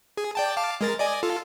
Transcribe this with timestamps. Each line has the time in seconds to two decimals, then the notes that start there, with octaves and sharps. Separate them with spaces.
0.17 G#4
0.35 D5 G5 A5
0.57 F5 A5 D6
0.81 G#3 A#4 A6
0.99 D5 D#5 G#5
1.23 F4 A4